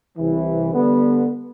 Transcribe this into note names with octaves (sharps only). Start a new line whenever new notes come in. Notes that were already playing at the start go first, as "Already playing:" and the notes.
C2 C3 E3
D3 G3 B3